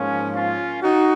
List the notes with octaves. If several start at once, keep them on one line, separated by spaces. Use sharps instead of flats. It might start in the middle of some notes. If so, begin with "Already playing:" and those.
Already playing: G#2 F3 A#3 C#4
C#4 F4
D#4 F#4